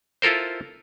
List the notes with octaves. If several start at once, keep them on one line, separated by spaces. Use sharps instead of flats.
E4 F4 A4 A#4 C5